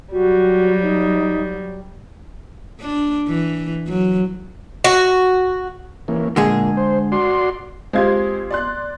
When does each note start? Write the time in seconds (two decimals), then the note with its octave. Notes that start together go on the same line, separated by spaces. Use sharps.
0.12 F#3 G3 F#4
0.83 D#4
2.81 D4
3.28 E3
3.88 F#3
4.84 F#4
6.08 E3 A#3 C#4
6.36 A#2 D3 G#3 G#4
6.77 C5
7.12 F#4 D5 C6
7.93 G#3 C4 F4 G4 G#6
8.51 D5 C6 F#6